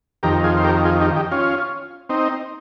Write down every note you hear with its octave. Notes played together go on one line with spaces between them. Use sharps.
F2 D#3 G4 A#4
F4 G#4
C5
G4 A#4
F4 G#4
D#4 G4
D#4 G4
C#4 F4
C4 D#4